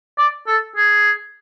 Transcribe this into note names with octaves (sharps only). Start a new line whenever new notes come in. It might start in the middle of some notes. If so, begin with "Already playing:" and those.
D5
A4
G#4